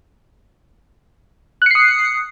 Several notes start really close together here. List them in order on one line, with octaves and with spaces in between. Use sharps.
F#6 C#7 C7 D#6